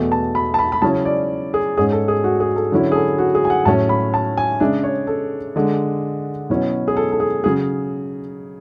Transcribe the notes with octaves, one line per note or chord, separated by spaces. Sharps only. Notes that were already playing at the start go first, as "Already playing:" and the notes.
Already playing: E2 B2 A3
A5
B5
A5
B5
B5
C#3 F#3 C#4 E4 A5
D5
G#4
G#2 G#3 C#4 G#4
A4
G#4
F#4
G#4
A4
D3 F#3 C#4 E4
G#4
A4
F#4
G#4
G#5
F#5
A2 F#3 C#4 A5
B5
A5
G#5
C#3 G#3 D4 E5
C#5
A4
D3 G#3 D4
B2 F#3 C#4 E4
G#4
A4
A4
G#4
C#3 F#3 G#4